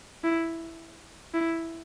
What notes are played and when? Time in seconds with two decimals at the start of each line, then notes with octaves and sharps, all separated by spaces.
0.24 E4
1.34 E4